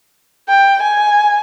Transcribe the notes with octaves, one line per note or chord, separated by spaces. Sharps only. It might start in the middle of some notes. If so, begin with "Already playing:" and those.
G5
G#5